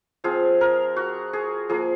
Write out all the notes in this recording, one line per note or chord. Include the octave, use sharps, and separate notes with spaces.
F3 C4 F4 G#4
A#4
F#4
G#4
F3 A#3 F4 G#4